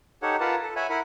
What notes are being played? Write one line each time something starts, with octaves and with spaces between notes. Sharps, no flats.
D#4 G4 A4 C#5 F#5
F4 A#4 B4 F#5 A5
A4
C#5 E5 F#5 G#5 B5
E4 A#4 F#5 B5